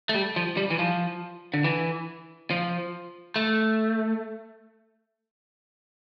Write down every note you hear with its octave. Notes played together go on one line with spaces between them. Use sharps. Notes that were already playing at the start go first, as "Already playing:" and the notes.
A3
G3
F3
G3
E3
F3
D3
E3
F3
A3